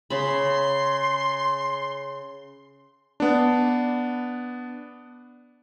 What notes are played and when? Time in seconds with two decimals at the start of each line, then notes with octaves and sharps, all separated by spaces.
0.10 C#3 B5 C6
3.20 B3 D4